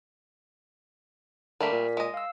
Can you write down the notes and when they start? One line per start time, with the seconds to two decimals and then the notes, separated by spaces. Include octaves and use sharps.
1.60 D3 G3 A3 A#3 A#4 B6
1.72 A#2
1.97 G#3 D#5
2.14 F5 E6